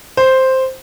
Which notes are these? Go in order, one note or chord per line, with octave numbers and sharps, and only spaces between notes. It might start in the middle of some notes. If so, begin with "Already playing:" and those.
C5